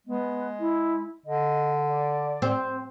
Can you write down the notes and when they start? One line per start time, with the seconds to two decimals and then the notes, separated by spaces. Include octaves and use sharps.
0.07 G#3 B3
0.60 E4
1.26 D3 D#5
1.89 D5
2.42 C4